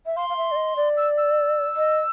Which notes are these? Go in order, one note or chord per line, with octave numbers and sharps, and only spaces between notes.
E5
F5 C6
F5
E5
D5
D#5
D5
E6
E6
D#5